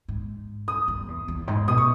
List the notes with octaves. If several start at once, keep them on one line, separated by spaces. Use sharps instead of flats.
G#2
D#6
G2
E2
E2
G#2
B2 D#6
C#6